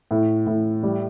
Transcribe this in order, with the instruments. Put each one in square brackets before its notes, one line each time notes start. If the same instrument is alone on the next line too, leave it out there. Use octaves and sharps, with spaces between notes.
[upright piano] A2
A2
G3